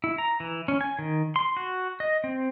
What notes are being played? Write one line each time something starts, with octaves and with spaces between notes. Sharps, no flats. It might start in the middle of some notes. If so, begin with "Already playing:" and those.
E4
A#5
E3
C#4
G#5
D#3
C6
F#4
D#5
C4